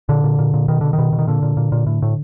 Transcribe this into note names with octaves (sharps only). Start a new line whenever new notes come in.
A#2 D3
A#2
A#2
A#2
B2 D#3
B2 D3
D#3
B2
B2
D#3
A#2 D3
A#2
A#2
A#2
A2
A2